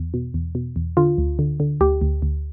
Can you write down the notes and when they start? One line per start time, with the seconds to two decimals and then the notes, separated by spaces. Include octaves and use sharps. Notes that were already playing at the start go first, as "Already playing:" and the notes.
Already playing: E2
0.14 B2
0.34 E2
0.55 B2
0.76 E2
0.97 D3 F4
1.18 D2
1.39 D3
1.60 D3
1.81 D2 G4
2.01 D2
2.22 D2